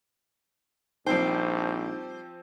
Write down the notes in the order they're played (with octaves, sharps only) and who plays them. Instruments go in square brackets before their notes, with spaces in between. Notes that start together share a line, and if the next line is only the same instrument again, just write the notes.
[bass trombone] A#1 [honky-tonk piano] F3 C4 G5 [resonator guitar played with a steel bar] G3 C5 [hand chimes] D#4